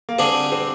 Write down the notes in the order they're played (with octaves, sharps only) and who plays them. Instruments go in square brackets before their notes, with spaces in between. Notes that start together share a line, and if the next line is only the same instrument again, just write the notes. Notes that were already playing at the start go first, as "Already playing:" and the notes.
[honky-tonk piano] A#3
[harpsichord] D3 G3 D4 G#4 [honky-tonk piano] C4
[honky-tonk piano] C4